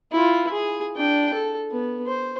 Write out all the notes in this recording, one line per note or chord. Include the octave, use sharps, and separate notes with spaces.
E4 F4
G#4
D4 G5
A4
B3
C5